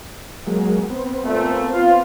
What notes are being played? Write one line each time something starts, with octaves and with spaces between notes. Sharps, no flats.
F#3 G#3 A#3
B3 C4
A#2 A3
F4